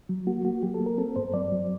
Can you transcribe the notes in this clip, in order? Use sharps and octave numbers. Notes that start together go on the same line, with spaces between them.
F#3
A#3 F#4
A#3 F#4
F#3 G4
A4
A#3
A#4
C4 A4
G2 C5
F#3 D5
F#3